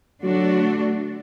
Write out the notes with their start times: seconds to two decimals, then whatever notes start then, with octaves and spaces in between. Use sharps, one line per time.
0.23 D3 F#3 A3 D4 F#4